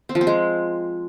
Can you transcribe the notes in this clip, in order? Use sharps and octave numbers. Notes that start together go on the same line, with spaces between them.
C4
F3
C4
G#3